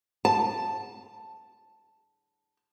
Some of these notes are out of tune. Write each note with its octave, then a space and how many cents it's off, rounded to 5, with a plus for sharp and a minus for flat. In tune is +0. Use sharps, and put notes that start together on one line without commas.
A5 +0